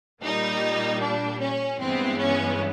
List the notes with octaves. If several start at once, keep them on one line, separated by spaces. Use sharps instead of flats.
A#2 G3 A#3 D#4
D4
C#4
G2 E3 G#3 B3 C4
C#4